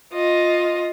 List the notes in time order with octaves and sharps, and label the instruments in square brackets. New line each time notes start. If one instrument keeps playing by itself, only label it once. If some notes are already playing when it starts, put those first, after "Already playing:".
[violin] F4 D#5